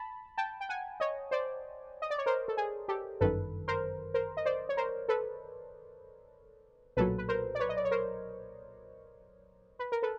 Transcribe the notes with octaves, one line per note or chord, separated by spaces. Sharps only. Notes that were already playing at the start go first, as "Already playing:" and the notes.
Already playing: A5 B5
G5 A5
G5
F#5 G#5
C#5 D#5
C5 D5
D#5
D5
C#5
A#4 C5
A4
G#4
G4 A4
G1 F#2 D#3 A4 B4
A#4 C5
A#4 C5
D#5
C5 D5
C#5
A#4 C5
A4 B4
B1 A#2 F#3 A4 B4
B4
A#4 C5
D5
B4 C#5
D#5
D5
C#5
A#4 C5
B4
A#4
A4 B4